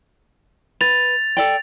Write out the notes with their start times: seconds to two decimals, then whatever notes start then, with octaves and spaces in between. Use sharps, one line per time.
0.81 B4 A6 F7
1.37 A4 D5 G5